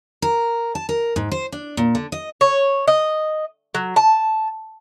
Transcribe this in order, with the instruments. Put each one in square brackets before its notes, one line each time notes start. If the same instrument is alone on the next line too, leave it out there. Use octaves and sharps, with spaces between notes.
[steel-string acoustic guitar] A#4
A5
A#4
G#2
C5
D4
A#2
D3
D#5
[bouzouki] C#5
D#5
F#3
A5